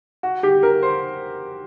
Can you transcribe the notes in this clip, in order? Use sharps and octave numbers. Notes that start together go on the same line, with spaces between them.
F#4
G4
A#4
C5